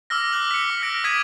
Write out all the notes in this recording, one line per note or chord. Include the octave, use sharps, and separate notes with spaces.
D6 E6 F6 A#6
D6 F6 F#6 F#7
B6 C#7
D6
F6 A#6 D7
D6 D#6 G#6 B6 D7 D#7